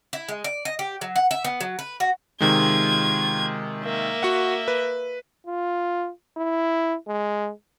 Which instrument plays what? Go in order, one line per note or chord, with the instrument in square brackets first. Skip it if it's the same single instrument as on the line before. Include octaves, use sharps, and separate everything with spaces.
[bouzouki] E4
G#3
D5
D#5
G4
F#3
F#5
E5
B3
F#3
B4
F#4
[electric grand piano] C3 D#3 G#3 [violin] F4 G#6
[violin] A#3 E5
[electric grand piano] F#4 F#5
B4
[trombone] F4
E4
G#3